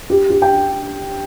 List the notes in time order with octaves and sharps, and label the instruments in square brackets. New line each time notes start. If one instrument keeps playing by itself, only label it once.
[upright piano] G4
G4
G5